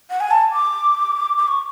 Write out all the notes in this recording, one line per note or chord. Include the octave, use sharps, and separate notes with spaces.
F#5
G#5
A5
D6
D6
C#6